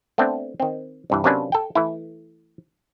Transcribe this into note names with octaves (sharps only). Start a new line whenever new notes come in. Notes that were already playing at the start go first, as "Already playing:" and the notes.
A3 B3 C4 D4
D#3 C4
C2 G2 E3
C3 F#3 A#3 C#4 D4 B4
A4 G5
E3 A3 E4